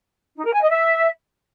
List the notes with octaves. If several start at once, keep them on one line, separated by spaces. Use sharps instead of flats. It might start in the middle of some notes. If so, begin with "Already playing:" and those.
D#4
A#4
G#5
D#5
E5